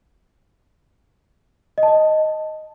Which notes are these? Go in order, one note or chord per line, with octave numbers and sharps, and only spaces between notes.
D#5
A5
D#5